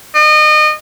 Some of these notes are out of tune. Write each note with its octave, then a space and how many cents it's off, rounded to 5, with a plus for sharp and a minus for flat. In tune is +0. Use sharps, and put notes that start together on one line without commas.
D#5 -35